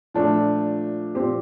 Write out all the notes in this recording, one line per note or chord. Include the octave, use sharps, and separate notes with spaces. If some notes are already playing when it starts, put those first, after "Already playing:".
A#2 F3 A3 D4
A#2 F3 C4 G4 C5